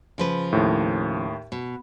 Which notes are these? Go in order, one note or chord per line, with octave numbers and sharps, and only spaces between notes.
C#3 F3 B4
D#2 A2
B2